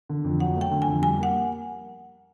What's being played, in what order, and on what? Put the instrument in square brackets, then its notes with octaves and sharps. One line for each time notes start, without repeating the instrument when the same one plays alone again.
[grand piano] D3
F2
[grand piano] F#3 [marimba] F#5
[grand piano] A3
[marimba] G5
[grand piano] D3
[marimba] G#5
[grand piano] F2
[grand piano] G3 [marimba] G#5
[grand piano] A#3 [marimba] F#5